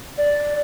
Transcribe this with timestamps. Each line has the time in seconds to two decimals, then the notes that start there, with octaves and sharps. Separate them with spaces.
0.18 D5